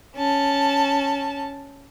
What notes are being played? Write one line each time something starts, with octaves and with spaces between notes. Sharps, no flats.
C#4 A5